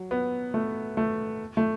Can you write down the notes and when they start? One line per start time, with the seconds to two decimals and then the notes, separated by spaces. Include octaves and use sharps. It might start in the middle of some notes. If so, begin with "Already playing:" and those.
Already playing: F#3
0.11 B3
0.54 A3
0.97 A3
1.57 A3